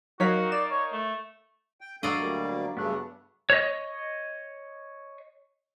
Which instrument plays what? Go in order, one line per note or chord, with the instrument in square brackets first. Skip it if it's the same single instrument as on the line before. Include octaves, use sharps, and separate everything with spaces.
[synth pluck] F#3 C#5 B6 [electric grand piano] D#4 A#4 F5 [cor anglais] F#4
[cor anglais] D5 [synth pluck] E7
[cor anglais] C#5
A3
[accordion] G5
[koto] F#3 D5 D#5 [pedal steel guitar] D4 [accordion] A4 F5
[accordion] D2 G3 A#3
[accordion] G2 C#3 A3 [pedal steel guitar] B3 D4 F#6
[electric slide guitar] C#5 D#5